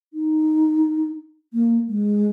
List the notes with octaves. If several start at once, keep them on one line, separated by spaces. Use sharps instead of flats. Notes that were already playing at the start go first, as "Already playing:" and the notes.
D#4
A#3
G#3